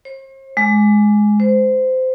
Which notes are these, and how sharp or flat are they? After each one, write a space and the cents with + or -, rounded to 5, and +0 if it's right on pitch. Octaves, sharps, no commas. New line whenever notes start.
C5 +45
G#3 +10
C5 -20